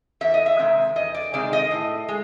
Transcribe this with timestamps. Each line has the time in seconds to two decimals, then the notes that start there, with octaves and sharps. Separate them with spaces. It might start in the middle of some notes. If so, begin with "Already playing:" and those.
0.21 E2 E5
0.34 D#5
0.46 E5
0.59 C3 D#3 G#3 C4
0.96 E2 D#5
1.14 D5
1.33 C3 D#3 G#3 C4 D5
1.53 D#5
1.71 A2
2.09 G#3